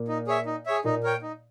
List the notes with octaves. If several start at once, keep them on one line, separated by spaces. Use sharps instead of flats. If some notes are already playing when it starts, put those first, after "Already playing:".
Already playing: A#2 A#3
D#4
G#4 C#5 E5
D#4
G#4 C#5 E5
A#2 A#3 D#4
A#4 C#5 G5
D#4